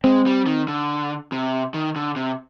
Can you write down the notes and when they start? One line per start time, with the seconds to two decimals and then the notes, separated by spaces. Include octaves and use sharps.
0.04 G#3 C4
0.26 G3
0.46 D#3
0.68 D3
1.32 C3
1.74 D#3
1.96 D3
2.16 C3